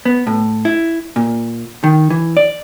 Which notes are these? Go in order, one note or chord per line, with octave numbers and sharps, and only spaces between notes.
B3
A2
E4
A#2
D#3
E3
D5